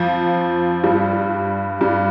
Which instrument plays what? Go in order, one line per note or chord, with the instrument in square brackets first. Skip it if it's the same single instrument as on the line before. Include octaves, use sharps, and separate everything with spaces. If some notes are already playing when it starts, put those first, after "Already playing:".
Already playing: [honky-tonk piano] F2 F3
G2 G3
G2 G3